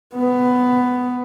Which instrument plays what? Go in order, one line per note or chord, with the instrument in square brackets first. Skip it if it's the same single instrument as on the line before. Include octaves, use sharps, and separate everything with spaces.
[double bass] B3